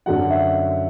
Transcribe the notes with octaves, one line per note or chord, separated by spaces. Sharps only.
F#2 D3 F#3 F#5
E5